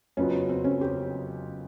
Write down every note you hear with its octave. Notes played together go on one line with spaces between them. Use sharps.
F#1 F2 C#3 F#3 B3 C#4
C4
C#4
G4